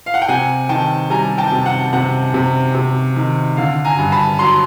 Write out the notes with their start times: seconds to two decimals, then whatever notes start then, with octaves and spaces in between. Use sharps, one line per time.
0.06 F5
0.14 F#5
0.22 G5
0.28 C3 F#5 G#5
0.69 D#3 G5 A5
1.10 G3 G#5 A#5
1.38 G5 A5
1.52 C3
1.66 F#5
1.93 C3 F#5
2.34 C3
2.75 C3
3.16 D#3
3.57 D3 F5
3.85 G#5 A#5
3.98 G2
4.12 A5 B5
4.39 F#3 A#5 C6